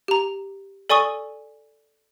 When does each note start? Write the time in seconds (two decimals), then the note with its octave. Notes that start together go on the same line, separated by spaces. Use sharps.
0.08 G4 A#5
0.90 A4 D5 G#5 C#6 D#6